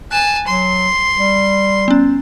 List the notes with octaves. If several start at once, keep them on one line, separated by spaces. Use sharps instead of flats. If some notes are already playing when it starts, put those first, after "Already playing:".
G#5 A5 F#6
F#3 C6
G3
B3 C#4